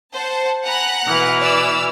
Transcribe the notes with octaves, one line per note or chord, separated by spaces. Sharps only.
C5 F#5 A5
F#5 G#5 A#5 B5 F#6
B2 E3 F6
D5 E6